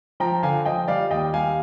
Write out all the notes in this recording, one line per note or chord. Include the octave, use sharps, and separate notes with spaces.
F3 G5 A#5
D3 F5 G#5
F3 D#5 G5
G3 D5 F5
D#2 D#5 G5
G3 F5 G#5